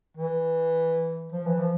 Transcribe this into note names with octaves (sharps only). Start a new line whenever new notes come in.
E3
F3
E3
F3